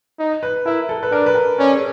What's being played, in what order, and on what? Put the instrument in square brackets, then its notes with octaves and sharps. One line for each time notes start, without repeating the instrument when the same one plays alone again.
[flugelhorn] D#4
[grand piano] B4
[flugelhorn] E4 [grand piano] A#4
[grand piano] A4
B4
[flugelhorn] D4 [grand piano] A#4
[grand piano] B4
A#4
[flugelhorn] C#4 [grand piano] D5
[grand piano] G#4